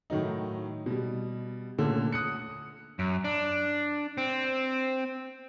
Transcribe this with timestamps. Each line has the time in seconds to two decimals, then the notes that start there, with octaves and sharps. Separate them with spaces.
0.10 A2 D#3 F#3 D#4
0.86 B2 G3
1.78 A#2 D3 A3 C#4
2.12 D#6 F#6 C#7
2.99 F#2
3.25 D4
4.18 C4